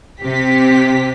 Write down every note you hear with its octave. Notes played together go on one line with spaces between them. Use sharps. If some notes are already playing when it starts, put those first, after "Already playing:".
C3 G4 B6